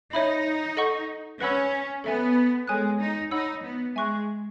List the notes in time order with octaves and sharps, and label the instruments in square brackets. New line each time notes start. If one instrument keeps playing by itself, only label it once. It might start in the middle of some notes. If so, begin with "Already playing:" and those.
[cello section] D#4 [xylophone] C#5 E5 B5
[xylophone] A4 D#5 F#5 C#6
[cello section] C#4 [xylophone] B4 F#5 B5 E6
[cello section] B3 [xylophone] A4 E5 G#5
[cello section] G#3 [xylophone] A4 C#5 G#5 D#6 F#6
[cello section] D#4
[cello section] D#4 [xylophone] C#5 F#5 B5 E6
[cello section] B3
[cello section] G#3 [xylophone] E5 G#5 C#6 F#6